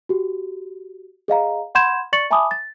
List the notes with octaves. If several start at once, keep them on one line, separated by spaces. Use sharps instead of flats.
F#4 G4
G#4 D#5 F5 A#5
F#5 B5 C6 G6 G#6 E7
D5 C#6 A6 C#7 F#7
E5 G#5 A5 B5 D6 D#6
A6